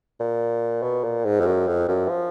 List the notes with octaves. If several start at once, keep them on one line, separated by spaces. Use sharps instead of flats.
A#2
B2
A#2
G#2
F2
F#2
F2
F#2
F3